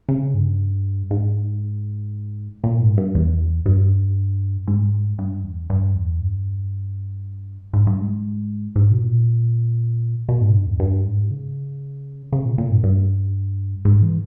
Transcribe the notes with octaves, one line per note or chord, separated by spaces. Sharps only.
C#3
G2
G#2
A#2
G#2
G2
E2
G2
G#2
G2
E2
G2
E2
G2
G#2
G2
G#2
G#2
B2
A#2
B2
G#2
G2
E2
G2
G#2
C#3
C#3
A#2
A#2
G2
G2
G#2
E3